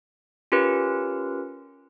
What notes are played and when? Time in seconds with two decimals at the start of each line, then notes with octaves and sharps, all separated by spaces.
0.52 C#4 F4 G4 A#4 B4